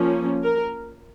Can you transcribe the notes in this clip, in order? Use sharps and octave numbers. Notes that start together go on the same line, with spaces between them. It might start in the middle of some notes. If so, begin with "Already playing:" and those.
Already playing: F3 A#3 C#4
A#4